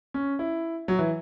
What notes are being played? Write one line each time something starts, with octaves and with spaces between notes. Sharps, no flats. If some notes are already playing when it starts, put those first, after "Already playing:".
C#4
E4
F#3
E3